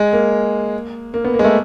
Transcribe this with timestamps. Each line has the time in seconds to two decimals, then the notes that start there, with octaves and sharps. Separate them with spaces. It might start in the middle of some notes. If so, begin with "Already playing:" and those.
Already playing: G#3
0.13 A#3
1.14 A#3
1.25 B3
1.34 A#3
1.39 G#3
1.44 A3